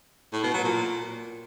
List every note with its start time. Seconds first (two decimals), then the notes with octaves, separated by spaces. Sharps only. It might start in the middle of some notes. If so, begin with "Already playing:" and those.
0.33 A2
0.43 B2
0.54 F#3
0.64 A#2